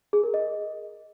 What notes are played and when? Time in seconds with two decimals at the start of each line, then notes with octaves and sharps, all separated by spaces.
0.13 G#4
0.23 A#4
0.34 D#5